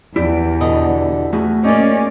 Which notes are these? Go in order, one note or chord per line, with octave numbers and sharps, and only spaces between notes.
E2 E4 G4 D5
B2 D3 D#5
E2 A3 F#4 G#4
A#3 C#4 D#4 D5